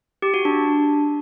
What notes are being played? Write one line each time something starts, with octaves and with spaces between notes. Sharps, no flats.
G4
F#4
D4